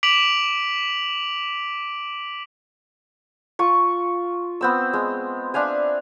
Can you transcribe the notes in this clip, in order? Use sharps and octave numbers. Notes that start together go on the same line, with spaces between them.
D6 B6 D7 F7 F#7
F4 C#6
B3 C4 E6
G#3
D4 E5 F5 G#5